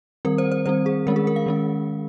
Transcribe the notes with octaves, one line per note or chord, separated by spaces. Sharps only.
D#3 G3 C4 A#4
C5
C5
D#3 G3 C4 C5
G#4
D#3 G#3 C#4 A#4
G#4
A#4
F5
D#3 G#3 C#4